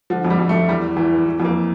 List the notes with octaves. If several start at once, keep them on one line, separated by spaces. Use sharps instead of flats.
D3 F3
F2
G3
F2
F2 A3
E2 G3
E3
E2 E3
E3
E3
F2
A#3